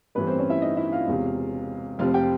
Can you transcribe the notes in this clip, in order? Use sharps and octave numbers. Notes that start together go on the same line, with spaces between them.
A1 G2 E3 A3 B3 B4
C4 C5
C#4 C#5
E4 E5
D#4 D#5
E4 E5
F4 F5
E1 E2 C3
F1 F2 C3 F3 F4 F5
G4 G5